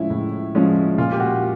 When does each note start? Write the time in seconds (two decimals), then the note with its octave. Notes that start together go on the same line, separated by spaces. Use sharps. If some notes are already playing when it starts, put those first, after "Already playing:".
Already playing: A2 F3 G#3 C#4 E4
0.10 A2
0.55 F3 G#3 C#4
0.98 A#2 F4
1.12 G4
1.20 F#4